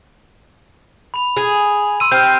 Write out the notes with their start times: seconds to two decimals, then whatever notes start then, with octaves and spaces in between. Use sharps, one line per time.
1.14 B5 F7
1.37 G#4
2.00 C6 E6 D#7
2.12 C4 G4 F6 G6